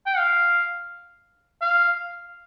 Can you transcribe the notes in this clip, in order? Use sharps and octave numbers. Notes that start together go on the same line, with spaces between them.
G5
F5
F5